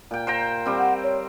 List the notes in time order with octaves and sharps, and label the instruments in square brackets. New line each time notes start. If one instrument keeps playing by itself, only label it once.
[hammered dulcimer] A#2 G5
C5 G5 A#5
G3 C4
[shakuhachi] F#5
C#5